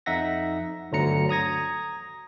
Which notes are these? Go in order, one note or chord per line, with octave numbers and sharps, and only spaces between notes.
F2 D#4 E5 F#5 A#6
G1 D2 D3 F#3 A#5 C#7
A#5 D#6 G#6 A#6